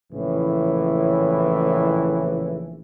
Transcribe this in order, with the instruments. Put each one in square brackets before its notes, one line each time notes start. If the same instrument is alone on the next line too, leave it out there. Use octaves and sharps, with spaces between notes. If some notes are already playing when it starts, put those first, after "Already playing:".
[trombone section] A#1 A2 C#3 E3